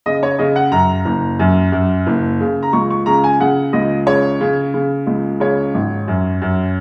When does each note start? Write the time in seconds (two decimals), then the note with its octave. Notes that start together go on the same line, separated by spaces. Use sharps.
0.06 C#3 D#5
0.23 C#5
0.39 C#3 D#5
0.56 F#5
0.72 F#2 A#5
1.05 F#1
1.39 F#2
1.72 F#2
2.07 F#1
2.40 C#3
2.63 A#5
2.73 C#2 C#6
2.90 C#6
3.06 C#3 A#5
3.24 G#5
3.40 C#3 F#5
3.73 C#2 D#5
4.06 C#3 C#5
4.41 C#3
4.74 C#3
5.07 C#2
5.40 C#3 C#5
5.74 G#1
6.08 F#2
6.42 F#2